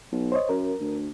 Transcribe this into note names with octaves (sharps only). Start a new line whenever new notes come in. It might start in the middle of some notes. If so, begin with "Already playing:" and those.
B1
C5 C#5 D#5
F#2 A#4
D2